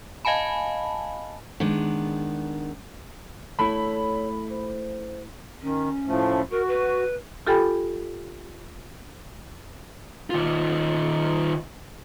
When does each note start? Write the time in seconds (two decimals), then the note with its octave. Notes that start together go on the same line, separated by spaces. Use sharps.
0.25 D#5 F5 G#5 A5 B5
1.60 D#3 G#3 B3 D4
3.59 A3 E4 C#5 B5
4.50 C5
5.62 D#3 C#4
6.06 A2 F3 A3
6.51 F#4 A#4
6.68 B4
7.47 F4 G4 A4 G5 G#5 B5
10.30 D#3 F4